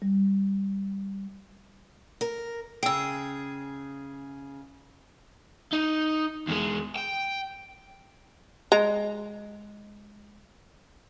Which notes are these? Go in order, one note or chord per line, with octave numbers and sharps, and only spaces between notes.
G3
A#4
C#3 G#4 G5 E6
D#4
E2 G#3
G5
G#3 A#5